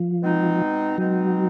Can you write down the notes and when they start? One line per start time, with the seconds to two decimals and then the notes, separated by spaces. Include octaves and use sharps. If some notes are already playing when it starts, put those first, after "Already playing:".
Already playing: F3
0.22 B2 G#3 C4 D#4
0.98 B2 F#3 G#3 C4 D#4